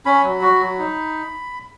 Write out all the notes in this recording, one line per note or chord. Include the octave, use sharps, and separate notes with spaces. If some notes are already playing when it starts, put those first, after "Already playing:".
C#4 B5
F#3
F#4
F#3
D#4